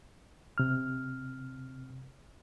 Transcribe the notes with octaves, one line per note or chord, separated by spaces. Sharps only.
C3 F6